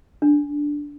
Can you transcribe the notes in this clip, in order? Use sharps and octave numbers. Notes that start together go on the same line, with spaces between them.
D4